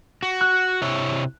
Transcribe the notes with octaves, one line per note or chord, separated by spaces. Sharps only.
F#4
F#6
C3 E4 C#5